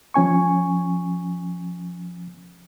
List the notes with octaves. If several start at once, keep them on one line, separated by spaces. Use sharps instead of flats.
F3 C#4 G#5 C#6